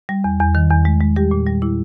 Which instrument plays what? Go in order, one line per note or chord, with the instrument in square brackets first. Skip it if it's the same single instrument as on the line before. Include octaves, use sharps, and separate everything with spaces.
[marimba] G3
E2
E2
D#3
E2
G#3
G#3
G3 G4
A#2
G3
A#2 E4